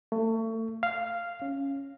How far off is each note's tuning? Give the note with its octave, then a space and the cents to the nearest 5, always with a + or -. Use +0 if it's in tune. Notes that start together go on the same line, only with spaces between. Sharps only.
A3 +35
F5 -10
C#4 -5